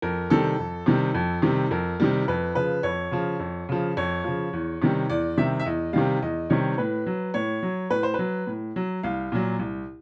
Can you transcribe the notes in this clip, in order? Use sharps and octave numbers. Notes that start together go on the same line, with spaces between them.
F2 A#4
C3 D#3 G3 A4
F2
C3 D#3 G3
F2
C3 D#3 G3
F2 A#4
C3 D#3 G3
F2 B4
C#3 F3 B4
F2 C#5
C#3 F3
F2
C#3 F3
F2 C#5
C#3 F3
E2
C3 D#3 G3
E2 D5
C3 D#3 G3 E5
E5
E2 D#5
C3 D#3 G3 F5
E2 D#5
C3 D#3 G3 C#5
A2 B4
F#3
A2 C#5
F#3
A2 B4
C5
F#3 B4
A2
F#3
C2 F5
A#2 F#3
C2